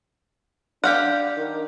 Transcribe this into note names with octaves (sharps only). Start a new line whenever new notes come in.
D4 G4 F5 F#5
D#3